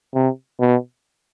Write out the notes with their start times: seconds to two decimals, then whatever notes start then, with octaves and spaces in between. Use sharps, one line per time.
0.14 C3
0.61 B2